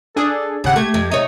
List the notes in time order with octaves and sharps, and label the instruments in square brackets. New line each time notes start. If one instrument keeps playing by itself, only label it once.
[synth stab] D4 G#4 [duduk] A4
[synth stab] G#1 F#5 [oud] C#3 [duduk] G4
[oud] A3 [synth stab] G#6
[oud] F2
[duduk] C3 [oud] D#4 C#5